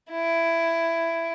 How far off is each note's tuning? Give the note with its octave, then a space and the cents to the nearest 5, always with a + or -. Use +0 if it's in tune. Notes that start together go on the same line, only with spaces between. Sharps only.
E4 +15